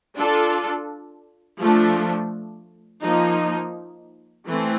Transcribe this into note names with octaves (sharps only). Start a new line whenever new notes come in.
D4 F4 A4
F3 A3 D4
F3 A#3 D#4
E3 A3 C4